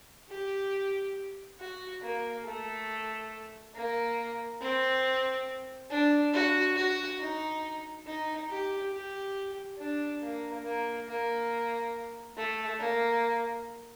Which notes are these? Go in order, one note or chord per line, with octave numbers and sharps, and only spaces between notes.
G4
F#4
A#3
A3
A#3
C4
D4
F#4
F#4
D#4
D#4
G4
G4
D4
A#3
A#3
A#3
A3
A#3